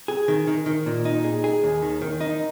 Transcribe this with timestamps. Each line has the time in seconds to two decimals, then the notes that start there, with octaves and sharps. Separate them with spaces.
0.08 G#4
0.28 D#3
0.47 D#3
0.66 D#3
0.86 A#2
1.05 D#4
1.24 G#4
1.44 G#4
1.63 D#2
1.82 D#3
2.02 D#3
2.21 D#4